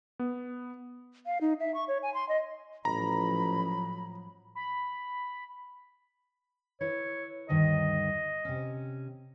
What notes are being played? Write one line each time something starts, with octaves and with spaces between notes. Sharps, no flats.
B3
F5
D#4
E5
C#6
C#5
G#5
C6
D#5
A1 A2 F3 F#3 A#5 B5
B5
E4 B4 C#5
D2 G2 D#3 D#5
C3 C#4